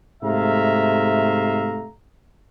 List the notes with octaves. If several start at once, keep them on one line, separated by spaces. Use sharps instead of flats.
G#2 C3 A3 E5 F5 A#5